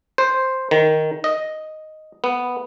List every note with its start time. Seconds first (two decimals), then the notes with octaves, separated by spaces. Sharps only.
0.18 C5
0.71 D#3
1.24 D#5
2.24 B3